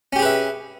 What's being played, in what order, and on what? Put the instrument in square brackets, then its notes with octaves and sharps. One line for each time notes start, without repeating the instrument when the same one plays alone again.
[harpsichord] C#4
G4
G#4
B4
E5